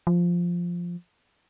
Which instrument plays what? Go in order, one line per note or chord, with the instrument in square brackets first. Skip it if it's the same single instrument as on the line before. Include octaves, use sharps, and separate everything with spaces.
[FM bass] F3